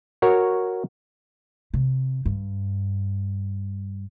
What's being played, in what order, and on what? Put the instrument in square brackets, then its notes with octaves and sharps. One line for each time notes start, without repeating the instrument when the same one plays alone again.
[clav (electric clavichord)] F#4 A#4 C#5
[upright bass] C3
G2